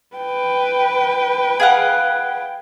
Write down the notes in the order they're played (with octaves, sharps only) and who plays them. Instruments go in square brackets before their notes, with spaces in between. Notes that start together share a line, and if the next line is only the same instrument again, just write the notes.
[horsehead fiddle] B4 G5
[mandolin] G#4 F5 F#5